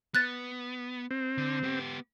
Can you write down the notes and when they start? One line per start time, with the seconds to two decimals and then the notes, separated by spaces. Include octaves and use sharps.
0.15 B3 F#6 A6
1.11 C4
1.38 D3
1.64 B3 G4